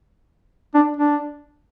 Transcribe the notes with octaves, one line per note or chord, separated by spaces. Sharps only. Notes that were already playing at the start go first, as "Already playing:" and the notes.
D4
D4